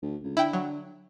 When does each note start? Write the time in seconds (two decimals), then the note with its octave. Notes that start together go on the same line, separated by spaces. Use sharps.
0.02 D2
0.24 C#2
0.37 D3 E4 G5
0.53 F#3